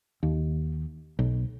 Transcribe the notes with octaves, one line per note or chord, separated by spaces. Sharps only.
D#2
B1